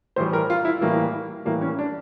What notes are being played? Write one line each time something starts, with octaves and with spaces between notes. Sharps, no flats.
A2 E3 G3 C5
A#4
F4
E4
A2 E3 G3 A#3
A2 E3 G3 A#3
C#4
D4